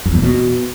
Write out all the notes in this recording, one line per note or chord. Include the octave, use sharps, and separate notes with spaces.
F#2
E2
A#2
B2